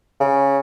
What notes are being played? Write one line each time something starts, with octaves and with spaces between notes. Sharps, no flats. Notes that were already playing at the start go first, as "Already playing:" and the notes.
C#3